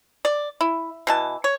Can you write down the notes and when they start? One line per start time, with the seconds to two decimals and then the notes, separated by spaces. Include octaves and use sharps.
0.25 D5
0.61 E4
1.07 B2 E3 A5
1.44 C#5